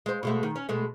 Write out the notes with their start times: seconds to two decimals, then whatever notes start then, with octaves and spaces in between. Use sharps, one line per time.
0.06 G#3 C5
0.23 B2 G#3 A3
0.43 D#3
0.56 C#4
0.69 B2 G#3 A3